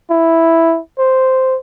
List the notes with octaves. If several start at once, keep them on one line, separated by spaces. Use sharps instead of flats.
E4
C5